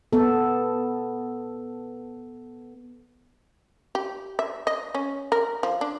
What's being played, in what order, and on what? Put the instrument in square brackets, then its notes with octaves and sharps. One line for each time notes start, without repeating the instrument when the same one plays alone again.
[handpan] B3 A4
[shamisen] G4
E5
D#5
C#4
A#4
F3
D4